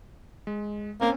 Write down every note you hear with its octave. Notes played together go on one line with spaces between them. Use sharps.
G#3
A#3 C4 C#4